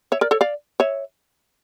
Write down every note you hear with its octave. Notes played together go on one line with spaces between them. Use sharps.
C#5 E5
A#4 D5
A4 C#5
D5 F5
C#5 E5